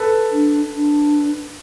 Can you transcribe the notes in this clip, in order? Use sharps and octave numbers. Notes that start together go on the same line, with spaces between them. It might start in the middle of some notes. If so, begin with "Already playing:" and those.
Already playing: A4 B4
D4
D4